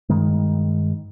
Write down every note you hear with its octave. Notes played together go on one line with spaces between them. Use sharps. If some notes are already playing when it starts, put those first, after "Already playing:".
G2 D#3 G#3